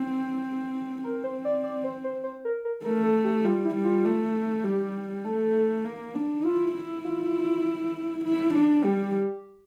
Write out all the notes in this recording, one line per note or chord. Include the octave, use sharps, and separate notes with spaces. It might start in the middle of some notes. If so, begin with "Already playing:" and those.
Already playing: C4
C4 A#4
C5
D5
D5
C5
C5
C5
A#4
A#4
A3 A#4
A4
G4
G3 F4
E4
G3
F4
A3
G3 G4
A3 A4
A#3
D4
E4 F4
E4
F4
E4
D4
G3 G4